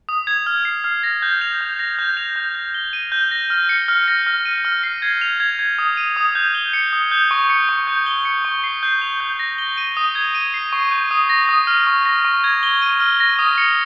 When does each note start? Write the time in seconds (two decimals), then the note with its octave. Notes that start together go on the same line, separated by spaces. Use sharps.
0.09 D#6
0.27 G#6
0.46 F6
0.65 C7
0.84 F6
1.03 A#6
1.22 G6
1.41 F7
1.61 G6
1.79 A#6
1.99 G6
2.17 F7
2.36 G6
2.55 A#6
2.74 G7
2.93 D#7
3.12 G6
3.31 A#6
3.50 F6
3.69 C#7
3.88 F6
4.08 A#6
4.27 F6
4.45 D#7
4.65 F6
4.83 C7
5.02 G#6
5.21 F7
5.40 G#6
5.59 G#6
5.78 D#6
5.97 D#7
6.16 D#6
6.35 G6
6.55 G7
6.73 C#7
6.93 D#6
7.11 G6
7.31 C#6
7.50 C#7
7.69 C#6
7.87 G6
8.06 G7
8.25 C#7
8.45 C#6
8.64 C7
8.83 G6
9.01 F7
9.20 G6
9.39 A#6
9.58 G7
9.77 D#7
9.97 D#6
10.15 G#6
10.35 D#7
10.54 C7
10.73 C#6
10.91 G6
11.11 D#6
11.30 A#6
11.49 D#6
11.67 F6
11.87 C#6
12.05 A#6
12.25 C#6
12.44 G#6
12.63 G7
12.82 D#7
13.00 F6
13.20 A#6
13.39 D#6
13.58 C#7